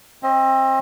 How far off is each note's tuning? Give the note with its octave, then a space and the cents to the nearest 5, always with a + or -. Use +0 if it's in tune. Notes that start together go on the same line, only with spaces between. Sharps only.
C4 +30 D#5 +25